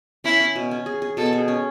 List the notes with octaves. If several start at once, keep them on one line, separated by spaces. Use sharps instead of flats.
C#4 E4
C#4
B2
C#4
G#4
G#4
B2 A4
G#4
C#4